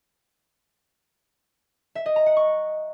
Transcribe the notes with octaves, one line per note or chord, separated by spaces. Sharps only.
E5
D#5
A#5
F#5
C#6